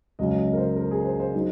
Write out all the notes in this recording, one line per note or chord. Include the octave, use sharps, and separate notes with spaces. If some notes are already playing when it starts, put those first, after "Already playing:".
C#2 C#3 F#3 C#4 D#5
D#5
A#4
C5
A#4
G#4
C5
C5
F#3 D#4